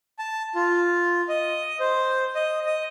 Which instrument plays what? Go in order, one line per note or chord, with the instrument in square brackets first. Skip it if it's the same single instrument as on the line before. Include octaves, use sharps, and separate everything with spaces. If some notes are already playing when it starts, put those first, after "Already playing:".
[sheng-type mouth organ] A5
F4
D#5
C5
D#5
D#5